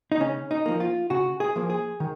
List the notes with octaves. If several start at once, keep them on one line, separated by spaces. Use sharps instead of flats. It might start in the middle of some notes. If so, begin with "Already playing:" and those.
D#4
C#3 C#4
D#4
F3 A#3
F4
C#3 F#4
G#4
F3 A#3
G#4
D#3